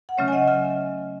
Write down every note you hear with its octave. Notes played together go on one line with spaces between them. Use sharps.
F#5
C#3 F#3 A3 C#4 C#5 E5
G#5
D#5 F#5
C#3 E5 G#5